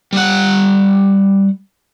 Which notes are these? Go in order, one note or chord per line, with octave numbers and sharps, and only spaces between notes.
G3 F#5